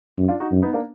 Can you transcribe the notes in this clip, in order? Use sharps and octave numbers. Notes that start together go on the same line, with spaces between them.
F#2
D4 F4
D#4 F#4
F#2
B3 D#4
A#3 D4